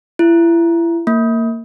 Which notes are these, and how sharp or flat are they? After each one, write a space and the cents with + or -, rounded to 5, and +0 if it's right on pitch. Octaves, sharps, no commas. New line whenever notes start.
E4 +30
A#3 -25